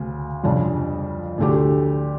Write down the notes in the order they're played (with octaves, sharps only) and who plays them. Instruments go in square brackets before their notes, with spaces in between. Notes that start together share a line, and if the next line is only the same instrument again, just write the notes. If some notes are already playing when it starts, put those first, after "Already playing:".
Already playing: [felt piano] D2 C#3
F2 C#3 G3 D4
D2 D3 A3 D4 G4